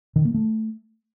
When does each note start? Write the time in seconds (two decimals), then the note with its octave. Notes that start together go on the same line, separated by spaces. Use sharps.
0.16 D#3
0.25 A#3
0.34 A3